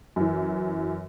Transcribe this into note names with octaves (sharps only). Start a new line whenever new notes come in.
F#2 E3